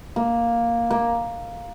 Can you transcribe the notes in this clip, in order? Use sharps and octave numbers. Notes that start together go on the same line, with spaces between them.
A#3
A#3